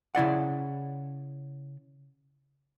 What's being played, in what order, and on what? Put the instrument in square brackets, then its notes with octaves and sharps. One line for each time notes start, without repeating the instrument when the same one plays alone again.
[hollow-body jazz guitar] C#3 E4 D5 F#5